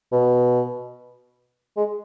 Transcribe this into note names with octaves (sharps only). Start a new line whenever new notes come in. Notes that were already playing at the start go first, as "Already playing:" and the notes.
B2
G#3